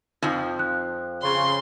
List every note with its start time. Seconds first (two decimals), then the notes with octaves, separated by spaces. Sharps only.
0.22 F2 F3 D#4
0.59 F#6
1.22 C#3 C6